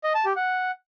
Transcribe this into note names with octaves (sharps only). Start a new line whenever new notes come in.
D#5
A5
G4
F#5